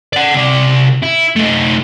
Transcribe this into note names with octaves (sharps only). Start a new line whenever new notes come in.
D5 F#5
C3 D5
E4
A3 D#4